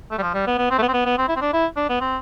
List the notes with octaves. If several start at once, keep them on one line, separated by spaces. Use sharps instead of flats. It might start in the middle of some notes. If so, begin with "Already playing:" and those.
A3
G3
F3
G3
B3
B3
C4
A3
B3
C4
B3
B3
C4
E4
C4
D4
E4
D4
B3
C4